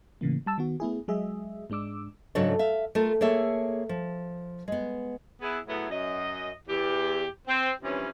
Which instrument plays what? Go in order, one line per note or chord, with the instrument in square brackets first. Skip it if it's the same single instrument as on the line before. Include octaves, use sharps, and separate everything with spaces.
[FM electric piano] A2 C#3 E3 A#3
G3 A5 E6
D#3 B3 F#4
A3 B3 E4 G#4
F#3 G#3 G#4 D#5 E5
G#2 G#3 D4 D6 E6
[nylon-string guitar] G#2 C#3 F#3 D4 A4 C#5
E5 F5
A3 F4 A4 A#4
A#3 G#4 A4 C#5 E5
F3
G#3 B3
[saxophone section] B3 E4 G#4
A2 F#3 A3 B3 E4 G#4
F#2 D#5
E2 G4
C4
G2 C3 E3 F3 C#4